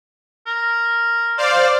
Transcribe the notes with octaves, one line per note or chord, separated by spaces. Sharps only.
A#4
C5 D5 F5